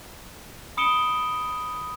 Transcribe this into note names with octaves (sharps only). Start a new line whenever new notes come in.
B5 D#6 C#7 D7 E7 G7